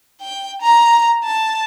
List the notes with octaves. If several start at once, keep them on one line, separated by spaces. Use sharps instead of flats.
G5
A#5
A5